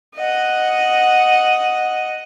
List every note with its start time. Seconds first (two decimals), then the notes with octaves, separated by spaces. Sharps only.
0.15 D#5 F#5